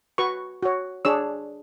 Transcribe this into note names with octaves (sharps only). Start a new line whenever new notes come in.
F#4 B4 C#6
F#4 C#5
D4 G#4 C#5 E6